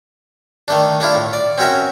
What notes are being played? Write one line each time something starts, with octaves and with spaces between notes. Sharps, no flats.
D#3 A3 D4
A3 D4 E4 F4
A2
D5
C4 C#4 F#4 A#4 E5